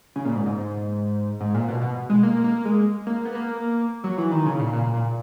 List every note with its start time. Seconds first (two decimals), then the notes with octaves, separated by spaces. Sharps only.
0.16 C#3
0.25 A#2
0.35 G#2
0.46 G#2
1.40 G#2
1.55 A#2
1.68 B2
1.81 B2
2.09 G#3
2.23 A#3
2.44 A#3
2.65 G#3
3.07 A#3
3.25 B3
3.35 A#3
4.04 F#3
4.18 E3
4.31 D#3
4.45 C#3
4.59 A#2
4.73 A#2
4.83 A#2
4.93 A#2